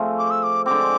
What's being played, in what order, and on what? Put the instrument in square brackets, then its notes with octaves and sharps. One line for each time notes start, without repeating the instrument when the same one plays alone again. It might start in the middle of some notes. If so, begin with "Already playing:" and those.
Already playing: [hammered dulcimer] F3 A3 C4 G#4
[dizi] D6
E6
D6
[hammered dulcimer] D3 G#3 C4 [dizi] D6